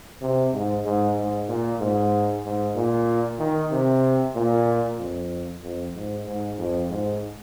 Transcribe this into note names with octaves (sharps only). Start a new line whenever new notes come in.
C3
G#2
G#2
G#2
A#2
G#2
G#2
A#2
D#3
C3
A#2
F2
F2
G#2
G#2
F2
G#2